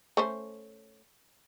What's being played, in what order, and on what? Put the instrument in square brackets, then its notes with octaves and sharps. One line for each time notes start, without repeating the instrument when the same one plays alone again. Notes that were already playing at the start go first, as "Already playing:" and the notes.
[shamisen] A3 C#4 C5